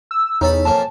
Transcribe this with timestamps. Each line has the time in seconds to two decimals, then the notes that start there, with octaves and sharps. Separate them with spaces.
0.11 E6
0.41 E2 C#4 D#4 A4 B5
0.65 F2 A#3 C#4 A5